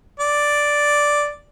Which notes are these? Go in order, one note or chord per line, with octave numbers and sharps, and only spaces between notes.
D5